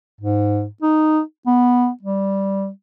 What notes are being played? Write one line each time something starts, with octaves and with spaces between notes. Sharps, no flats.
G#2
D#4
B3
G3